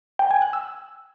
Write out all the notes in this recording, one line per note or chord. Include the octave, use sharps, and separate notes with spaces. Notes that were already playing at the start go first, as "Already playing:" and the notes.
G5
G#5
F#6
E6